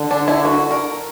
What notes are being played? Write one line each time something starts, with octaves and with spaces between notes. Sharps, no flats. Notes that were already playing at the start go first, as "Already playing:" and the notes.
Already playing: D3
D4
E4
F#4
A#4